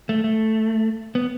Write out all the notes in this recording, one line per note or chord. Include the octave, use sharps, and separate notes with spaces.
A3
A3
B3